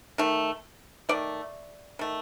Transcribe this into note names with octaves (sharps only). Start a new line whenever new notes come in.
D#3 A3
D#3 A3 D5
D#3 A3